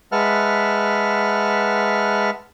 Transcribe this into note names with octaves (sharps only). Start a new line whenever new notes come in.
G#3 B4 E5 F#5 A5 F6